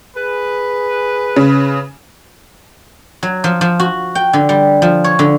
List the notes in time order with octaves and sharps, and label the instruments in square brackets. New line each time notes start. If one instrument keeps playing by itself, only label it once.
[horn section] G#4 B4
[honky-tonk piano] C#3
[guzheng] F#3
F3
F3
F#4
G5
D3
G3
F3
C#5
D3